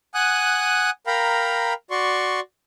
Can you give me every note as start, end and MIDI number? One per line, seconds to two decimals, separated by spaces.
0.15 0.90 78
0.15 0.90 80
0.15 0.90 87
0.15 0.90 90
1.07 1.73 70
1.07 1.73 77
1.07 1.73 79
1.07 1.73 82
1.07 1.73 83
1.91 2.40 66
1.91 2.40 74
1.91 2.40 84
1.91 2.40 85